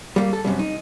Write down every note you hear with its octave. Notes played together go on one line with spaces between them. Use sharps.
G3 G#3 A#3
A4
F#2 C3 G3
D#4